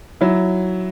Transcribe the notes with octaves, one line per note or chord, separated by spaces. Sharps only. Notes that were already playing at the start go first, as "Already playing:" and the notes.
F#3 E4